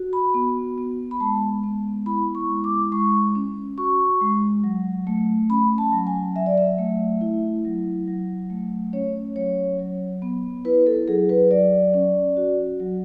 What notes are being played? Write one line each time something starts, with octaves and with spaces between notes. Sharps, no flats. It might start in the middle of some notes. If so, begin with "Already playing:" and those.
Already playing: F#4
B5
B3
B3
B5
G#3 A5
B3
E4 B5
C#6
G#3
D6
G#3 C#6
C#4
F#4 C#6
G#3
F#3
A3
C#4 B5
A5
F#3
G#5
F#3 E5
D5
E5
A3
E4
F#3
F#3
A3
C#4 C#5
F#3 C#5
F#3
B3
E4 B4
A4
F#3 G#4
B4
F#3 D5
C#4
F#4
F#3